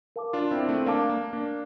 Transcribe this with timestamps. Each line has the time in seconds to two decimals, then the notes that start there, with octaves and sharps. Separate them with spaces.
0.16 A#4 F5 A5 D6
0.33 D4 F4
0.51 C4 E4
0.59 D4
0.69 A3 C4
0.86 A#3 D4 A#4 F5 A5 D6
1.10 A#3
1.33 A#3 D4